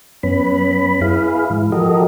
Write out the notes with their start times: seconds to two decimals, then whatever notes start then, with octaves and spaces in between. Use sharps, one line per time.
0.23 F#2 B3 C#4 B5
1.02 E4 G#4 B4 F5
1.50 G#2 E3
1.72 F3 F#4 G4 A4 A#4 D#5